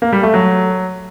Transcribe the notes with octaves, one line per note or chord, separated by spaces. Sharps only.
A#3
G3
A3
F#3